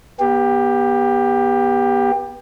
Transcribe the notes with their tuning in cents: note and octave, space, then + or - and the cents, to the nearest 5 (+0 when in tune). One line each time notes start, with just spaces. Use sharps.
B3 -25 G4 +15